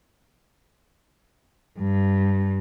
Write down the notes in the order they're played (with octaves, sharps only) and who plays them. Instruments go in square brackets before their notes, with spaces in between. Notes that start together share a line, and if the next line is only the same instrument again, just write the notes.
[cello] G2